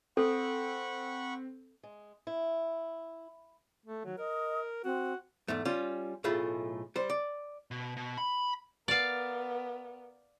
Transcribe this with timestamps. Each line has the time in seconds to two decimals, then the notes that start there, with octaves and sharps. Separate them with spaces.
0.17 C4 A4 F#5 B5 C#6
1.83 G#3
2.27 E4
3.86 A3
4.05 D#3 F#3
4.18 A#4 D#5
4.84 C4 F#4
5.48 E2 G#2 A3
5.65 G3 C#4 F4
6.24 B1 A2 A3 F4 G#4 B5
6.96 G3 C5
7.10 D5
7.71 B2
7.97 B2
8.17 B5
8.88 B3 A#4 D5 F5